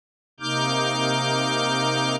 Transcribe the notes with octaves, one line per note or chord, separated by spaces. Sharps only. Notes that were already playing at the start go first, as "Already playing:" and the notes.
C3 A#3 D#4 D6 F6 G6